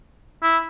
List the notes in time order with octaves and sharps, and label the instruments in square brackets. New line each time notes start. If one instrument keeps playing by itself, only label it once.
[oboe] E4